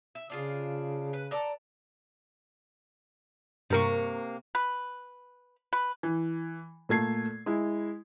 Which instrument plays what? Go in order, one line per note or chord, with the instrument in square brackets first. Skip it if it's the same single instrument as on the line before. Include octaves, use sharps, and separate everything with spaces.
[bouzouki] E5
[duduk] C#3 [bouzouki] D4 F4 G#4
[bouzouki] B4
A4 D5 A#5
[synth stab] G2 A#4 C#6 [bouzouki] C3 A#3
[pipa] B4
B4
[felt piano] E3
A#2 A3 G#6 C7
G#3 E4